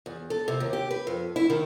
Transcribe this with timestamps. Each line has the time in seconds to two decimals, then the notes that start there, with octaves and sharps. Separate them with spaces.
0.06 E2
0.30 A4
0.48 C3
0.60 D#2
0.73 G4
0.91 B4
1.07 F2
1.36 E4
1.50 D#3